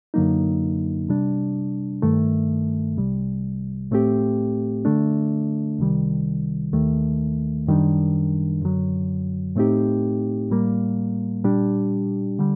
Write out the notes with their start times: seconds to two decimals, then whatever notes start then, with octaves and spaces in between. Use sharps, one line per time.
0.14 F#2 D3 F#3 A#3 D#4
1.08 C3 G3 D4
2.02 G2 D#3 A3
2.97 C2 C3 G3
3.91 A2 A3 C4 G4
4.85 D3 A3 D4
5.79 C2 C3 D#3 G3
6.73 D#2 D#3 A3
7.67 F#2 D#3 G3 D4
8.61 F#2 D3 F#3
9.56 A2 A3 C4 D#4 G4
10.50 A2 G3 A#3
11.44 A#2 G3 D4 G4
12.39 D3 G3